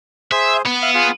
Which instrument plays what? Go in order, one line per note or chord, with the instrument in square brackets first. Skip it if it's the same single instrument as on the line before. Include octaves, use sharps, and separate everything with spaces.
[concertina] G#4 C5 [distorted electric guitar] E5
[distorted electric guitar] B3
[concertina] E5 F5
F4 G#4 F5